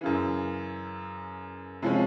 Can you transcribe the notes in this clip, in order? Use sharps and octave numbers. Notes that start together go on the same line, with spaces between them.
F#2 C#3 E3
C3 F3 G#3 C#4